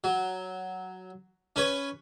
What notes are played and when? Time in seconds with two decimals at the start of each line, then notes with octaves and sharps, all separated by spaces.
0.04 F#3
1.56 C#4 B4 C#5